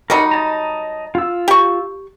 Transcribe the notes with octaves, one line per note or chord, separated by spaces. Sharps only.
F#3 G3 D#4 A#4 D#5 F#5
D#5 A5 A#5
F4 E6
G4 C#6